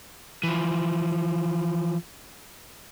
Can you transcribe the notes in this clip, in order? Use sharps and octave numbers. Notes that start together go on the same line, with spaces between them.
E3 F3